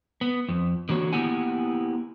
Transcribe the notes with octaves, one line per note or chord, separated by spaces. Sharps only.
B3
F2
D3 E3 A#3 F#4 C#5
A#3 B3 E4 G4 F#5 G#5